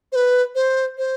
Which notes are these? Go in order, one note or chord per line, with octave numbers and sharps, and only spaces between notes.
C5
B4
C5
C5